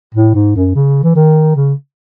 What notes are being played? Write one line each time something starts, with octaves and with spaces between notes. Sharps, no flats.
A2
G#2
F#2
C#3
E3
D#3
C#3